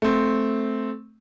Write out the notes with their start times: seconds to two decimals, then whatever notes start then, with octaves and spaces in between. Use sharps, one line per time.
0.02 A3 C4